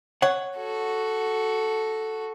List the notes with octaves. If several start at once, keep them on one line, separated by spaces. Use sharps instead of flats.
C#5 F#5
F#4 A4